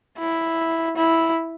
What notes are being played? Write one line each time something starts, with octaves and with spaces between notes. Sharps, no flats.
E4
E4